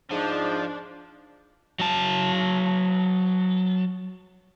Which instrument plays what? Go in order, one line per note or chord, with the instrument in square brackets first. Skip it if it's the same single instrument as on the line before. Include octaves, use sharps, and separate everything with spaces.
[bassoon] G#2 [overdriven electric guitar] F3 [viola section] D4
[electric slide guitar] F#3 A5